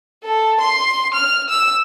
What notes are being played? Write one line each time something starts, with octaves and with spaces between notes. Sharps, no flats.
A4
C6
F6
E6